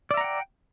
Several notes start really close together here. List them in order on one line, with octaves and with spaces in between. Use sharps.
D5 E5 A#5 F#5 G5